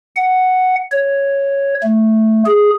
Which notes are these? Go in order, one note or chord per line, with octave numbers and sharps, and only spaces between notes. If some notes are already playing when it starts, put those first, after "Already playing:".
F#5
C#5
A3
G#4